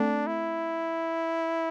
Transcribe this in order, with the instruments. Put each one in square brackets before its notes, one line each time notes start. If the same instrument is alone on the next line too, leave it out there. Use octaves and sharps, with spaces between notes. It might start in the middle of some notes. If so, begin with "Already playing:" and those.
Already playing: [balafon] A3 C4 A4 [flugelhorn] D4
[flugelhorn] E4